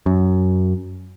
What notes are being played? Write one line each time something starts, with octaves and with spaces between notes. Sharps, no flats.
F#2